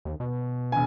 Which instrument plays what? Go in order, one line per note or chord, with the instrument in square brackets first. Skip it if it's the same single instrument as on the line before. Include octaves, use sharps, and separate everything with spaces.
[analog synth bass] D#2
B2
[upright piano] E1 G#5